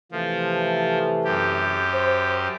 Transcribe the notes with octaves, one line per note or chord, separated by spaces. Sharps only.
C3 E3 F3 A3
F#2 G4
C5